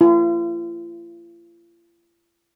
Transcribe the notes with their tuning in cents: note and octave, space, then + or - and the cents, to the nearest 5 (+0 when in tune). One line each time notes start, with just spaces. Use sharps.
F4 -45